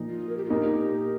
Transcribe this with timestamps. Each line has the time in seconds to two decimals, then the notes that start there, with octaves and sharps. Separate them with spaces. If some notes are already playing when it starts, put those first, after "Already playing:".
Already playing: A#2 F3 D#4
0.09 F4
0.29 A#4
0.37 G4
0.45 F4
0.50 A#2 A#3 D#4 G4